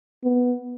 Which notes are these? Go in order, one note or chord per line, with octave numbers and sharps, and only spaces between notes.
B3